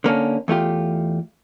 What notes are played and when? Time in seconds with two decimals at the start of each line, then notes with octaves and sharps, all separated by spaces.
0.04 D3 A#3 C#4 A4
0.48 E2 A3 F4 G4